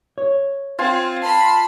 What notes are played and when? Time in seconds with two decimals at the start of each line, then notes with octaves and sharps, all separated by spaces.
0.18 C#5
0.79 C4 F4 G#5
1.22 A5 B5 C6